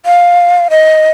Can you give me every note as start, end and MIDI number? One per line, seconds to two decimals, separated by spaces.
0.06 0.68 77
0.70 1.11 75